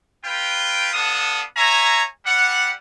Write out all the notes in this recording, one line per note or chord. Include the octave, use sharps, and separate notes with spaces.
F4 B4 G5
B3 D4 A4 F5 D#6
C#5 E5 G#5 A#5
G3 F#5